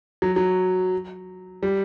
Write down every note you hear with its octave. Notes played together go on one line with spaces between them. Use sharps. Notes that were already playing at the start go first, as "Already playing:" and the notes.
F#3
F#3
G3